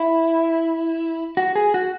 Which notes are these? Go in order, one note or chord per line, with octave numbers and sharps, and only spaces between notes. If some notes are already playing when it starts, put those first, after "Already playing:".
Already playing: E4
F#4
G#4
F#4